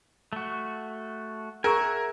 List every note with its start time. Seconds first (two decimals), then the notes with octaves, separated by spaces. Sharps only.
0.33 A3 F#4
1.64 G#4 A#4 E5 F#5 G#5 C#6